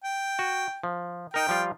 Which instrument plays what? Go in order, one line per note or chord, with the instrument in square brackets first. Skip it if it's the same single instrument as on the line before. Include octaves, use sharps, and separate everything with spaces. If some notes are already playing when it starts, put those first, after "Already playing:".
[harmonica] G5
[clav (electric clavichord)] F#4
F3
[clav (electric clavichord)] D#4 A#4 [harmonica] G5
[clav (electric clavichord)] F3 G3 F4